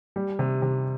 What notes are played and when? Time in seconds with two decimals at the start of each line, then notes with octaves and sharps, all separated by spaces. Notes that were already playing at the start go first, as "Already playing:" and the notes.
0.16 G3
0.39 C3
0.62 C3